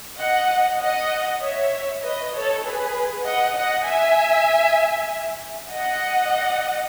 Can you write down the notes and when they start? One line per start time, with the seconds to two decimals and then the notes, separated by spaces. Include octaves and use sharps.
0.20 D#5 F#5
0.82 D#5 F#5
1.42 C#5 E5
2.04 B4 D#5
2.34 A4 C#5
2.65 G#4 B4
3.25 D#5 F#5
3.56 D#5 F#5
3.86 E5 G#5
5.70 D#5 F#5